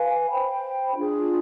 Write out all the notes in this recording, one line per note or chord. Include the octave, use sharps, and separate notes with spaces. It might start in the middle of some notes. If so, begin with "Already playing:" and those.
Already playing: B4 F5 G#5
C5 G5 B5
D4 F4 G#4